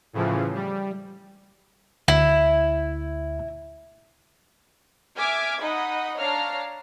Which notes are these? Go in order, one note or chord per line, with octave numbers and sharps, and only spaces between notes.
A2 C#3 E3 F3
G3
D2 E4
E5 G#5 D6 F6 G#6
D#4 D#5 F#5 B5
D4 C#5 F5 A5 A#5 F6